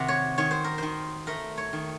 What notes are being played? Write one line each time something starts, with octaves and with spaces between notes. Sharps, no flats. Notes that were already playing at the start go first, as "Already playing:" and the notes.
Already playing: C3 D#3 F#4
C#5
D#3 C#5
C5
A#4
D#3 C5
A3 A#4
C#5
D#3